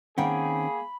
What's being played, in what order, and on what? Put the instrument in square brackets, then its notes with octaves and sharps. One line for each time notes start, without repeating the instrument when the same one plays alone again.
[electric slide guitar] D#3 C4 C#4 [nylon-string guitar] A#3 F#5 G5 [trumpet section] G#4 [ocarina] B5